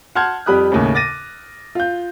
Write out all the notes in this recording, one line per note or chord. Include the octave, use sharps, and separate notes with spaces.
F#5 A5 C6 F6 G6 G#6
F2 G3 G4 B5 D#6 F#6
D#2 A2 C#3
D6 A6 A#6 D#7
F4 G6